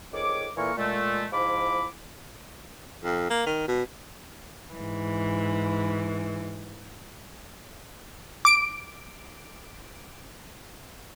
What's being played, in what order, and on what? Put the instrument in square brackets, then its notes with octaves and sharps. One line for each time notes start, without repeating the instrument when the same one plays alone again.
[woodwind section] F2 D#3 G#4 C#5 D6
A#2 E3 A#3 A4 A#4 C#6
A#2 G#3 A3
G#2 F3 E4 B5 D6
[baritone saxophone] F2
A#3
D#3
B2
[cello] G#2 E3
[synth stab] D6 D7